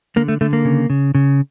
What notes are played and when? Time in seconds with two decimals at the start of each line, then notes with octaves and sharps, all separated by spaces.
0.16 D3 A#3
0.28 A3
0.41 D3 A3
0.53 A#3
0.65 C#3
0.90 C#3
1.15 C#3